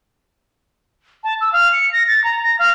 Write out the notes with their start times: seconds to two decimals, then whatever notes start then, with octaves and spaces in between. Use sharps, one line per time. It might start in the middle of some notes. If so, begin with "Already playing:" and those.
1.24 A5
1.41 E6
1.53 F5
1.73 C#7
1.93 A#6
2.08 A6
2.24 A#5
2.44 A#6
2.59 F5